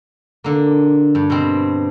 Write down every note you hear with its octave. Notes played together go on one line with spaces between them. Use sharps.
D3 A#3
G2
B2 C4